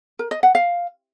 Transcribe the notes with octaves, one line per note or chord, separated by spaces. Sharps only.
A#4
D#5
F#5
F5